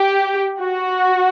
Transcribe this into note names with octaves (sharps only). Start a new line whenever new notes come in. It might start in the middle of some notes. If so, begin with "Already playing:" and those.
Already playing: G4
F#4